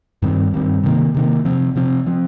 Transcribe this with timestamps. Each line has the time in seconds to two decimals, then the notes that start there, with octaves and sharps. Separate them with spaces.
0.22 G2 D#3 G3 C4
0.53 G2 D#3 G3 C4
0.83 C3 D#3 A#3
1.14 C3 D#3 A#3
1.45 C3 F3 C4
1.76 C3 F3 C4
2.06 F3 C4